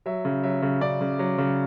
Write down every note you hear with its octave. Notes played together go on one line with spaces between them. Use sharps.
F#3 E5
C#3
F#3 E5
C#3
C#3 D5
C#3
F#3
C#3